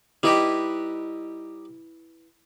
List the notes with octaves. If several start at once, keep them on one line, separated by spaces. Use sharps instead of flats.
G3 D#4 E4 G4 B4